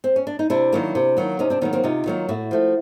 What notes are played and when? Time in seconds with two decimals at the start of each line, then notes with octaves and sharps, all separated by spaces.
0.04 C4
0.16 C#4
0.27 D4
0.39 D#4
0.50 C3 D4 E4
0.73 D#3 F#3 A#3
0.95 C3
1.17 D#3 F#3 A#3
1.39 C3 C#4 D#4
1.50 C4 D4
1.61 D#3 F#3 A#3 B3 C#4
1.73 A#3 C4
1.84 C3 D#4 F4
2.06 D#3 F#3 A#3
2.29 A2 E4 F#4
2.51 F3 A3